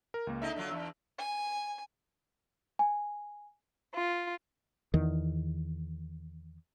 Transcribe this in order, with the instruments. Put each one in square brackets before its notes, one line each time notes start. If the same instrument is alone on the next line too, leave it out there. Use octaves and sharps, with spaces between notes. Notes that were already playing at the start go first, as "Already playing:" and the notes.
[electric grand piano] A#4
C#2 A#3
[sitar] D3 D#4 D#5 [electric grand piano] E5
[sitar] D3 F#3 F4
E2
[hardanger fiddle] G#5
[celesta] G#5
[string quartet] F4
[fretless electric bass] E2 D#3